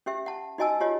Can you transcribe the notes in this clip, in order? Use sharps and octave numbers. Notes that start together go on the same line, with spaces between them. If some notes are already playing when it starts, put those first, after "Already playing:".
C#4 G4 E5
F#5 A5
D#4 F#4 D#5 G#5 A5 E6
F4 G4 C#5 D#5